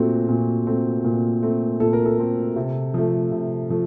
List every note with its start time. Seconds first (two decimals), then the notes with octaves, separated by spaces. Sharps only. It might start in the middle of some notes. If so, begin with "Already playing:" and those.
Already playing: A#2 A3 C4 F#4
0.28 A#2
0.67 A3 C4
1.04 A#2
1.42 A3 C4
1.80 A#2 A4
1.93 A#4
2.06 A4
2.18 A3 C4
2.56 C3
2.94 F3 A3
3.31 C3
3.70 F3 A3